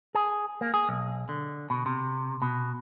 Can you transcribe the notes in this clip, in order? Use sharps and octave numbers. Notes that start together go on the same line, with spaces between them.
G#4
A#3
G#4
B1
D3
B2
C3
B2